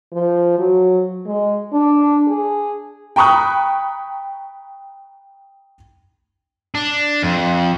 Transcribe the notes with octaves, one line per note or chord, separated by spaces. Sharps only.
F3
F#3
G#3
D4
G#4
G5 A#5 B5 C#6 D#6 F#6
D4
F2